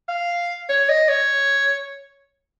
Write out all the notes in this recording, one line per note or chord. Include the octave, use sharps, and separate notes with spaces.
F5
C#5
D#5
C#5